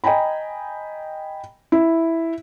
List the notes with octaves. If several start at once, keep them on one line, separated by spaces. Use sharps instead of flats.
D#5 G5 G#5 A#5 B5
E4